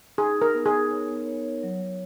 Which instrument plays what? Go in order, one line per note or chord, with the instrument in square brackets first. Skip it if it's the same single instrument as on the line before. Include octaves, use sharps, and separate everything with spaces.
[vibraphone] D#4 [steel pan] G#4
[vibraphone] D#4
[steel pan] A#4
[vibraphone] B3
[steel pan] G#4
[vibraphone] A#4
C#5
B3
C#5
C#5
F#3
F#3